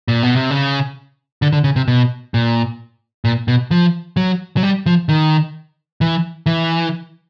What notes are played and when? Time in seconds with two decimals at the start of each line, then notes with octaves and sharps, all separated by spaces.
0.08 A#2
0.23 B2
0.36 C3
0.51 C#3
1.42 D3
1.53 D3
1.64 C#3
1.76 C3
1.88 B2
2.34 A#2
3.25 A#2
3.48 B2
3.71 F3
4.17 F#3
4.57 F#3
4.63 G3
4.86 F3
5.09 D#3
6.01 E3
6.46 E3